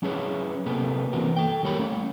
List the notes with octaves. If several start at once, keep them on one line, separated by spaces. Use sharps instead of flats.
F#3 C#4 E4 G#4 B4 C#5
C3 A#3 B3 A4 B4
E3 A#3 C4 F#4 A#4
A4 G5
D#2 G3 A#4 C#5 A#5 B5
A3 C#4